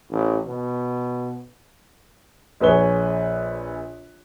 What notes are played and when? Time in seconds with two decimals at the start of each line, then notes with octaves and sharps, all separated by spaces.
0.10 A1
0.46 B2
2.61 A#1 G#4 B4 C#5 G7